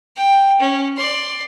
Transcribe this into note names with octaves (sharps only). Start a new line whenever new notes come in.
G5
C#4
D5 C6